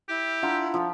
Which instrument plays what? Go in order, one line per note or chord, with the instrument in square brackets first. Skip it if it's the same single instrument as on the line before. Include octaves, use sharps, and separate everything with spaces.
[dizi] E4 [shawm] G4
[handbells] D4 F#5 A#5 [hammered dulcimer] F4
[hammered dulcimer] F3